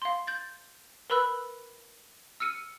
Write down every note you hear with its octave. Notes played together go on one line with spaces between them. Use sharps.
F5 C6
G6 A6
A#4 B4 B5 E6 F#6
E6 F6 C#7 D#7